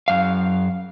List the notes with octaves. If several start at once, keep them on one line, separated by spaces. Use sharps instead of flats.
F#2 F5